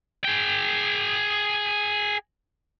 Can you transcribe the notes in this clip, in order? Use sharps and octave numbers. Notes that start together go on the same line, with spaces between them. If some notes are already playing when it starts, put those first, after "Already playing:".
G#4 G5